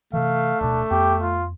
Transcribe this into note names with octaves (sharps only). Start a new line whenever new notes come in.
C3 E3 A3 F5
D1 B2 D4
F2 B3 G4
F4